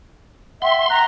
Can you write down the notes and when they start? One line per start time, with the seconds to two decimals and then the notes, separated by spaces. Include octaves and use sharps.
0.62 E5 F#5 G5 C6
0.90 F#5 A#5 F#6